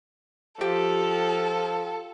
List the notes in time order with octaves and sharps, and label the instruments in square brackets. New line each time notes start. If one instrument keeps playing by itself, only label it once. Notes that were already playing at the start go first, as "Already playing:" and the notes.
[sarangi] F3 [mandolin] G4 [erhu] A4